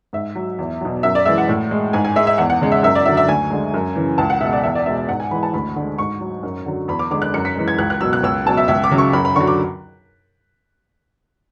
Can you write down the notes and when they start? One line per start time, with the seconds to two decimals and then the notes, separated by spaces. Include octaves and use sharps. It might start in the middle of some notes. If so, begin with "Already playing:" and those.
0.13 G#2 E5
0.35 F#3
0.59 E2
0.81 B2 F#3
1.03 F#2 E5
1.15 D5
1.25 E3 G#3 E5
1.38 F#5
1.49 A2
1.71 G#3
1.93 G#2 G#5
2.05 G#5
2.16 G#3 E5
2.27 E5
2.38 E2 F#5
2.50 F#5
2.61 C#3 G#3
2.72 E5
2.83 F#2 E5
2.95 D5
3.06 D3 F#3 E5
3.17 E5
3.28 D2 G#5
3.51 D3 G#3
3.74 F#2
3.96 C#3 E3
4.18 C#2 A5
4.30 F#5
4.41 B2 G#3 E5
4.53 D5
4.63 E2 E5
4.75 D5
4.86 B2 G#3 E5
4.97 E5
5.08 G#2 F#5
5.20 G#5
5.31 E3 G#3 B5
5.43 A5
5.53 D2 B5
5.76 D3 G#3
5.98 G#2 C#6
6.21 F#3
6.43 F#2
6.66 D3 F#3
6.88 E2 B5
6.99 D6
7.11 D3 G#3 D6
7.22 F#6
7.34 F#2 C#7
7.45 B6
7.56 E3 G#3
7.68 G#6
7.78 C#2 F#6
7.90 F#6
8.00 B2 F#3 E6
8.13 F#6
8.23 C#2 E6
8.46 B2 F#3 A5
8.57 E5
8.68 C#2 E5
8.84 D6
8.91 C#3 F#3
8.98 C#6
9.13 F#2 B5
9.25 B5
9.36 D3 F#3 C#6
9.47 D6